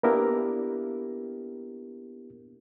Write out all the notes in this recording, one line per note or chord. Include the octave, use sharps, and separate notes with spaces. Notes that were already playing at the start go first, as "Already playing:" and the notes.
A#3 B3 D4 E4 G4 A#4